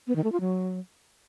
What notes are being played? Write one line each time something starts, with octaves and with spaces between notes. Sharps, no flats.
B3
D#3
A3
F4
F#3